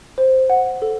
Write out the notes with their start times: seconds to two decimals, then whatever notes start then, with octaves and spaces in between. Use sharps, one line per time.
0.18 C5
0.50 F#5
0.82 A4